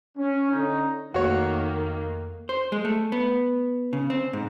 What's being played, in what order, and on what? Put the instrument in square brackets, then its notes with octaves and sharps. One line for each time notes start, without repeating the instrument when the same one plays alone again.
[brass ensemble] C#4
D3 C#4 D#4
[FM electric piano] F2 A3 [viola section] D#3 A#3 [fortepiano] F#4 C#5
[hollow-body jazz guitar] C5
G#3
A3
B3
C#3
C4
G#2